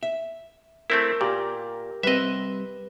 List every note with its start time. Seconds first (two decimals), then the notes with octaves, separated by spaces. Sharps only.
0.03 E5
0.90 A3 C4 E4 A#4
1.21 A#2 G4 A#4
2.03 G3 C4 B4 D#5 E5